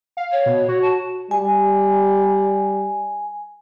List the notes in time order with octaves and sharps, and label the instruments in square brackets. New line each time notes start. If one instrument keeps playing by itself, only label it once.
[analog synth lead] F5
[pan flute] C#5
[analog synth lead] B2
F#4
[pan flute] A5
[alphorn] G3 [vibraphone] G#5